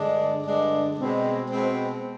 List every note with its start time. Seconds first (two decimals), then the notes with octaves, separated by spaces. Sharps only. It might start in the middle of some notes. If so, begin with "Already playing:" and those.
Already playing: G2 D3 G#3 D4
0.43 G2 D3 G#3 D4
0.96 B2 G#3 C4
1.49 B2 G#3 C4